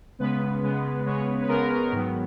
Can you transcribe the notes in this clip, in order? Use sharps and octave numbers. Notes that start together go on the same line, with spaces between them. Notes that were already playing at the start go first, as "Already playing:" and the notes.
C#3 G#3 B3 B4
C#3 G#3 B3
C#3 G#3 B3 C#5
B4
C#3 G#3 B3 A#4
G#2 D#3 F#3 B3